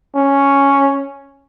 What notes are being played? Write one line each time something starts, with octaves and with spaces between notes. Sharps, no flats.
C#4